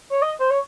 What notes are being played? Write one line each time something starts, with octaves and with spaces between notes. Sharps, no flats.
C#5
D#5
C5
C#5